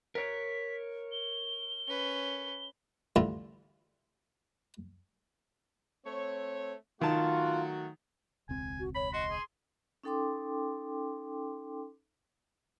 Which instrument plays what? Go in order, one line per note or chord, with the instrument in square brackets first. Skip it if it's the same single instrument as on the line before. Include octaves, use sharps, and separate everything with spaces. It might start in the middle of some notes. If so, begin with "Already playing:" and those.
[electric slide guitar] A#4 C#5 [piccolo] B6
[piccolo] G7
[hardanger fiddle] C#4 B4
[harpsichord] A1 D3 G3 E4 F4 A#5
[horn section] A3 C4 C#5
[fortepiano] D#3 A5 [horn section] F#3 A3 F#4 [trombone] F4
[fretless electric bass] E1 C#2 C4 [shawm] G#5
[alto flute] F#4
[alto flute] C#5 [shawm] B5
[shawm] F#4 [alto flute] D#5 [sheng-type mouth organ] C6
[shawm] G#4
[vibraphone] C#4 D#4 A4 G5 C6 D6